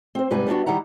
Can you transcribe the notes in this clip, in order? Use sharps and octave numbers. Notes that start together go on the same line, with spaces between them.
C4 C5
G#2 C3 G3 B4 G#5
G3 B3 C#4 D4 F#4
D#3 G3 E4 F#5 A#5